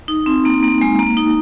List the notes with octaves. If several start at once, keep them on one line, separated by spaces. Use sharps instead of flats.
D#4
C4
A#3
A#3
G#3
A#3
D#4